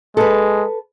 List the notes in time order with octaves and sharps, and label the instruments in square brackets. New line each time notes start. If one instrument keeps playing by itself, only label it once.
[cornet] G#3 [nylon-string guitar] A4 B4